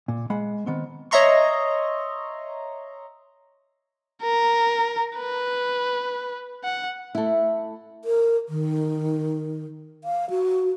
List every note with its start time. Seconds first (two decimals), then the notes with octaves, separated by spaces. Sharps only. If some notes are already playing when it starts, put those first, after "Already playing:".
0.08 A#2
0.30 G#3 F5 F#5 B5
0.66 D#3 B3 C4
1.11 C#5 D#5 E5 A#5 C6 C#6
4.23 A#4
5.16 B4
6.64 F#5
7.15 A3 E4
8.05 A#4
8.49 D#3
10.04 F5
10.30 F#4